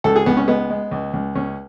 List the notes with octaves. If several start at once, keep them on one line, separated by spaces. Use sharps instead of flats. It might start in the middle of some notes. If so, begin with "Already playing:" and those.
C#2 A4
G#4
C#2 B3
C#4
G#3 B3
G#3
C#2
C#2
C#2 C#4